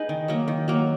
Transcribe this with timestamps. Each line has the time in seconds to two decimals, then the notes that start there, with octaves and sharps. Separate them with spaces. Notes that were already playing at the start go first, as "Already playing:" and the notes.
Already playing: D#4 G#4 B4
0.09 D#3
0.28 F#3 A#3
0.48 D#3
0.68 F#3 A#3